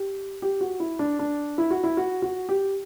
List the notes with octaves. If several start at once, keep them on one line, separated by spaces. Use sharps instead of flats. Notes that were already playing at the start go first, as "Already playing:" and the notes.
Already playing: G4
G4
F#4
E4
D4
D4
E4
F#4
E4
F#4
F#4
G4